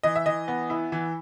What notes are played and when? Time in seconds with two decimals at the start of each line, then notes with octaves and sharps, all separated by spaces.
0.03 E3 D#5
0.16 E5
0.26 E3 D#5
0.48 B3
0.70 E4
0.92 E3